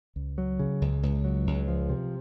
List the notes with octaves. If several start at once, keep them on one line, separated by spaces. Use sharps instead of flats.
C#2
F#3
C#3
C#2
C#2
F#3
C#2
F3
C3